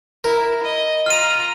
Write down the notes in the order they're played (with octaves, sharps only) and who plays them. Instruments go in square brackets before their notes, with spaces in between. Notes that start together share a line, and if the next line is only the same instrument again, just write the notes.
[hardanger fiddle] E4 [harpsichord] A#4
[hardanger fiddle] D#5
[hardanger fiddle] F4 A#5 [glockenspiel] F6 D#7